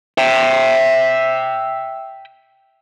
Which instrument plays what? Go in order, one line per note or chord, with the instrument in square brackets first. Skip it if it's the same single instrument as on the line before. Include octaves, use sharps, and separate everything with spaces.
[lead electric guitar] E5 G5